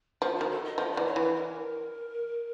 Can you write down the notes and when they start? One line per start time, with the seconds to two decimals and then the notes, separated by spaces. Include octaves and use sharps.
0.22 F3 F4
0.37 D#3 F#4
0.50 A4
0.64 D#5
0.78 F3 D#5
0.92 D5
0.97 E3
1.06 C#5
1.16 E3 B4
1.35 A#4